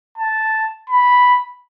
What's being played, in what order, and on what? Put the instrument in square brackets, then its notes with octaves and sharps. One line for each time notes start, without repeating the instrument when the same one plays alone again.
[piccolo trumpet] A5
B5